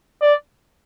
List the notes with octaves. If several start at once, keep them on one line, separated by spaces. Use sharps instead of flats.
D5